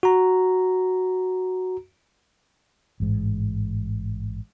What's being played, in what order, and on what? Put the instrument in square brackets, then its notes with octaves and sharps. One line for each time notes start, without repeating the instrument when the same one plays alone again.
[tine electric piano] F#4 A#5
[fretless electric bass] A1 G#2